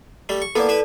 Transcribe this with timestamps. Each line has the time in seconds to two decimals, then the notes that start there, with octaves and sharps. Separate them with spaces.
0.29 G3 A3
0.42 C#6
0.55 A#3 B3 E4 A4 D5
0.69 E4 B4 E5